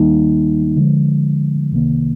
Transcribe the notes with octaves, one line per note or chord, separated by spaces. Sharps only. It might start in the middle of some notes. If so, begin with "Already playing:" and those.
Already playing: D#2 D#3 G3 A#3 D#4
D3 F3 G#3
C2 C3 D#3 A#3